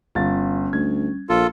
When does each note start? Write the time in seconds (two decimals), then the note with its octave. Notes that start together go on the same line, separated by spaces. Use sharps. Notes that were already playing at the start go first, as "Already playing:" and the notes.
0.15 G1 G3 C#4 F4 A6
0.73 D2 G#6
1.29 A#1 F4 A4